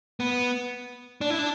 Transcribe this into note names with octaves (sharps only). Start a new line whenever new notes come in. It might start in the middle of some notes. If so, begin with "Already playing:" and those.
B3
D4
E4
D4